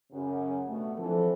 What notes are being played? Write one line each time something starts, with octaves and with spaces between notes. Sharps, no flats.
F#2 C#3
G2 B2 A3
D3 E3 F3 C4 A4